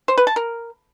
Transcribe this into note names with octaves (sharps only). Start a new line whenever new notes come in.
C5
B4
A5
A#4